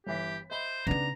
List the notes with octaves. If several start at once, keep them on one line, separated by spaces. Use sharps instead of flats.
G1 E3 G4 B6
C5 D#5 E5 B5
C#3 B3 D4 D#4 B4 A#5